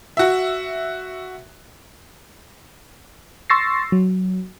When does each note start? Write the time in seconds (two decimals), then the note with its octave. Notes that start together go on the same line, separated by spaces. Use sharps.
0.17 F#4 E5
3.50 C6 C#6 E6 A6 A#6 C7
3.92 F#3